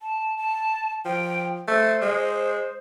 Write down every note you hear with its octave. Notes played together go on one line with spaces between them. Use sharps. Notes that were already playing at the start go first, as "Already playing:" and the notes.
A5
A5
F3 G5
A3 C5
G#3